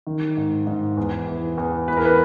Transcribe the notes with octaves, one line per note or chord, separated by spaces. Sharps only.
D#3
G#2
G#2
E2
E3
E2
E3 B4
A#4
B4